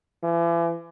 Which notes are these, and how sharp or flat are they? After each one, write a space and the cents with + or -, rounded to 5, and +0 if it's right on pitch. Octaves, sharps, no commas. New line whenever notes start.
E3 +40